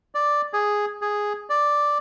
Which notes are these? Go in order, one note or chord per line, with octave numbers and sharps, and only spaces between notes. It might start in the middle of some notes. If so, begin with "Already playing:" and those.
D5
G#4
G#4
D5